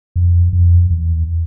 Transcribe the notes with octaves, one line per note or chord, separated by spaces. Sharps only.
F2
F2
E2